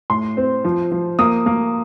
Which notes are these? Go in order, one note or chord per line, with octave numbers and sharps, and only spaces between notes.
A2 C6
C4
F3
F3
A#3 D#6
A#3